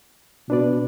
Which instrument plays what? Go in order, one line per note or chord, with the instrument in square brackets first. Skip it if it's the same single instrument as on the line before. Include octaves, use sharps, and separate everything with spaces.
[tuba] B2 [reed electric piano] D4 B4 D5